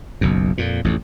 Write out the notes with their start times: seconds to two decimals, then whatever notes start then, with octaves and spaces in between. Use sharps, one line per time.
0.21 F#1 B1 F#2
0.58 F2 A#2
0.84 A1 F2